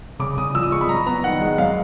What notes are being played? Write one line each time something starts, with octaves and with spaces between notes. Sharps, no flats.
C#3 D6
C#3 D#6
F3 E6
D#6
G#3 C#6
B5
F#2 A#5
B3 A#5
D#3 F#5
G#3
F#2 F5